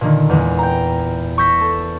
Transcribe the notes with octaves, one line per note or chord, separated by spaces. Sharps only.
A#2 D3 D#3
E2 A#2 G#3
G5 A#5
C#6 E6 G6 A#6 B6
A4